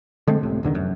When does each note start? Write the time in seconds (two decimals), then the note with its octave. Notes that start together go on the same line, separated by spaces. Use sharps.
0.27 D3 G#3 A3 C4
0.43 C#2 A2 C3
0.63 D1 E2 D3 D#3
0.74 F1 F#2